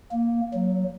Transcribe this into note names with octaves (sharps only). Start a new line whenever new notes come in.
A#3
F#3